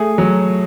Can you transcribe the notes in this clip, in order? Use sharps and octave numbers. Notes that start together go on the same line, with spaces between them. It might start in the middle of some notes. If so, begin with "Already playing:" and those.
Already playing: A3 G#4
F#3